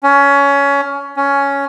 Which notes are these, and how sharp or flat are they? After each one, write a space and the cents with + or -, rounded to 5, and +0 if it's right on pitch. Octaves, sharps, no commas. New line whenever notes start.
C#4 +20
C#4 +10